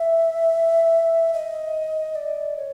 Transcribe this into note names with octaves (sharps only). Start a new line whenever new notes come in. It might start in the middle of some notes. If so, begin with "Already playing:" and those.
Already playing: E5
D#5
D5
C#5